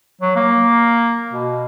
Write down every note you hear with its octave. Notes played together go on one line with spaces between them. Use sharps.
F#3
A#3
B2